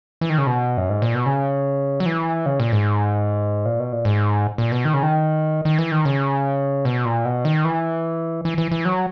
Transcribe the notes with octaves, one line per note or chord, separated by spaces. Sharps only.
E3
D#3
C#3
B2
F#2
G#2
A#2
B2
C#3
F#3
E3
C#3
A#2
G#2
A#2
B2
A#2
G#2
A#2
B2
D#3
C#3
D#3
D#3
E3
D#3
C#3
B2
A#2
B2
D#3
E3
E3
E3
E3
F#3